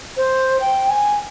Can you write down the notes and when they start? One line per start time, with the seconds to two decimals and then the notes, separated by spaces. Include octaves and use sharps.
0.16 C5
0.60 G5
0.89 G#5